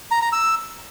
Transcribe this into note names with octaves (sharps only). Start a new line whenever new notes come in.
A#5
A#5
E6